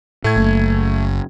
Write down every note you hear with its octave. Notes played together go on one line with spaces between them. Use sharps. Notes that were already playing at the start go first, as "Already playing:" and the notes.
A2 A3 G#6
F#1